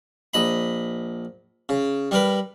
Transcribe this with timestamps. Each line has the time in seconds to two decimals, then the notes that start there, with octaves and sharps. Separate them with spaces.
0.34 A#1 D#5 B5
1.69 C#3
2.11 G3 A#4 B4